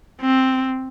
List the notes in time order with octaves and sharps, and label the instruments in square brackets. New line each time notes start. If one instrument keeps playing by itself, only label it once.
[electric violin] C4